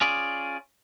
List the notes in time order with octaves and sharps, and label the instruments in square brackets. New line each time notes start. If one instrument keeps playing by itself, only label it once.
[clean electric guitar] C#4 F4 G#4 D5